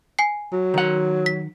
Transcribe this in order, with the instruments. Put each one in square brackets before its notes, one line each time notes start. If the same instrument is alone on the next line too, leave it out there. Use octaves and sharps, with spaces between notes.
[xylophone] G#5 C7
[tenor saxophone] F#3
[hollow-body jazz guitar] D#3 F#5
[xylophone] B6